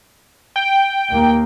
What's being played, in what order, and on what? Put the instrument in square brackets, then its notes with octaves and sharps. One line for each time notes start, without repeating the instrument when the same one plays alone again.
[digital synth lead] G5
[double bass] D#2 A#3